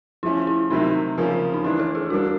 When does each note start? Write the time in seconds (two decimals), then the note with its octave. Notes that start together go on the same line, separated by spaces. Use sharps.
0.23 F3 A3 C#4 E4
0.47 E4
0.70 C3 D#3 F#3 A3 C4 D#4
1.18 C#3 F3 A#3 C#4
1.54 D#4
1.64 E3 A3 D4 E4
1.79 A4
1.95 G#4
2.10 D3 G3 A#3 D4 F#4